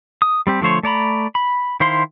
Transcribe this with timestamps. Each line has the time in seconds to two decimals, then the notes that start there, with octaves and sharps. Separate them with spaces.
0.22 D#6
0.47 G3 C4 G4
0.61 D3 F3 A3 C5 C#5
0.83 A3 D5 A#5 B5
1.35 B5
1.80 D#3 E4 C5 F5 C6